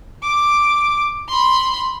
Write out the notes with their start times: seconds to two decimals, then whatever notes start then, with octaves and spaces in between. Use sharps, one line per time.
0.23 D6
1.28 B5 C6